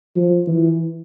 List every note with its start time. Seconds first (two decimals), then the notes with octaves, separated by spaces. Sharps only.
0.16 F3
0.47 E3